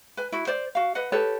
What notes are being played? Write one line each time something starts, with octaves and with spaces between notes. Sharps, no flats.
B4 G#5
E4 F#4
C5 D5
F#4 F5
B4 D#5 F#5
G4 A4 B4 C#5